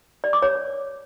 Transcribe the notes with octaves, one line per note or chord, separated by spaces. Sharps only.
D5
D6
C#5